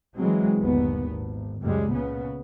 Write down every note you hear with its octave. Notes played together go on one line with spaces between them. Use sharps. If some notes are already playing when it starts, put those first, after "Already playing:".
E3 F#3 G#3 C4
G1 D#2 A#2 B3
G#1
C#2 F#2 G3 G#3
A#2 C#3 B3